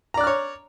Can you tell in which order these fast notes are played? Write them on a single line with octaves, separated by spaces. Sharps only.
A#5 D5 F#6 F6 C#5